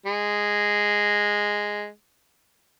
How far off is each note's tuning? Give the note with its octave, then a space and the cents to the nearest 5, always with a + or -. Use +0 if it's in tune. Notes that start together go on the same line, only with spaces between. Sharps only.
G#3 -5